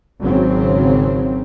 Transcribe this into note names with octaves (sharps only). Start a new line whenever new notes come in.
G#1 C#3 F#3 C4